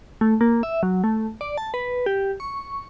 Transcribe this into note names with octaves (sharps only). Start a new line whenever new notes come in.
A3
A#3
E5
F#3
A3
D5
A5
B4
G4
C#6